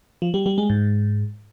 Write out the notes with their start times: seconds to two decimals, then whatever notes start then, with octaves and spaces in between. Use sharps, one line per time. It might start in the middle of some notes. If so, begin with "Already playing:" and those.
0.22 F3
0.34 G3
0.46 G3
0.58 G#3
0.70 G#2